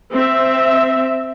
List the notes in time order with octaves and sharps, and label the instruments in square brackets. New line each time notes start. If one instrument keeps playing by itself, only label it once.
[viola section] C4 E5